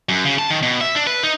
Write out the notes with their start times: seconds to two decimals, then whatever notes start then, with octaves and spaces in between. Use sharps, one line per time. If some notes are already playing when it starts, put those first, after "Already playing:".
0.09 F#2
0.25 C#3
0.39 A5
0.50 D#3
0.63 B2
0.81 E5
0.95 D4
1.07 B4
1.23 D#4